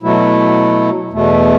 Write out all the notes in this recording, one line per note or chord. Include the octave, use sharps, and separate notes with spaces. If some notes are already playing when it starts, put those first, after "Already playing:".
B2 F#3 A3 E4
E2 B2 A3